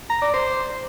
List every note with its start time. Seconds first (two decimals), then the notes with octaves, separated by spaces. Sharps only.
0.10 A#5
0.22 D5
0.34 C5